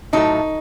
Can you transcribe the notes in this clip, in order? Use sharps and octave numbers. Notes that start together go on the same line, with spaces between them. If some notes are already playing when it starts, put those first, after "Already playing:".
A2 F#3 A3 D#4